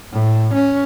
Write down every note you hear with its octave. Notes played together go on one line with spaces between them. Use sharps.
A2
C#4